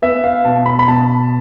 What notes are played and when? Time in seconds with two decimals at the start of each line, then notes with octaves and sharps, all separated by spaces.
0.02 B3 E5
0.24 F5
0.45 B2 A5
0.66 B5
0.79 B5
0.88 B2 A5